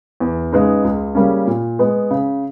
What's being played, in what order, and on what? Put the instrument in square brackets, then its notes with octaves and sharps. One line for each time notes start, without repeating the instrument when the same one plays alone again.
[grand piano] E2
C#3 G#3 B3 D#4
C#2
C#3 G3 A#3 C#4
A#2
G#3 B3
C#3